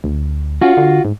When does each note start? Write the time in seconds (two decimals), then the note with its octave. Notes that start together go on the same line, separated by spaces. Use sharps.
0.04 D2
0.61 C#4 F4 F#4
0.77 D3
1.05 G#2